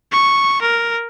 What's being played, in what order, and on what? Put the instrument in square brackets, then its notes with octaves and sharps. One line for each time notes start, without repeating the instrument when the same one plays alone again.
[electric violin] C#6
A#4